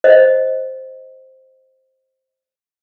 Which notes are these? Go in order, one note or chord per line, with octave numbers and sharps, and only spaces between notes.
C5 D#5